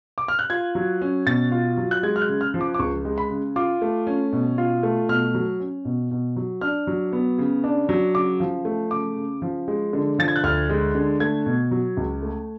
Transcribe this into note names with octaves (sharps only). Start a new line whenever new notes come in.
D6
F6
F#6
F4 G#6
F#3
C#4
B2 A6
F4
F#3
F#6
G#3 G#6
F6
F#6
C#3
F6
F3
D6
D6
C#2 C#6
G#3
B5
C#3
F4 D6
A3
C#4
B2
F4
A3
B2 F6
F#3
C#4
B2
B2
F#3
D4 F6
F#3
B3
C#3
D4
F#3
C#3 D6
F3
A3
C#3 D6
C#3
F3
G#3
D3
F3 A6
G#6
F#6
D2 F6
G#3
D3
A3 G#6
B2
F#3
C#2
A3